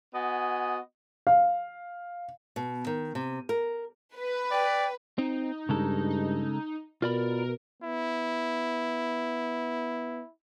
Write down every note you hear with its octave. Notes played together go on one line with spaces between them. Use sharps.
B3 F#4 D#5 G#5
F5
B2
D#3
C3
A#4
B4
D5 G5
C4 D#4
G2 C#3 G#3 A4
D#4
B2 F4 A#4 D5 B5
B3 E4